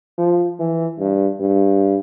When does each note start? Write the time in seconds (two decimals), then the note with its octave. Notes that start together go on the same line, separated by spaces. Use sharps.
0.18 F3
0.60 E3
0.99 G2
1.40 G2